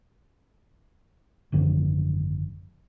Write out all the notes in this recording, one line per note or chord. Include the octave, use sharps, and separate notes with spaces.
G#1 F#2 D3 F3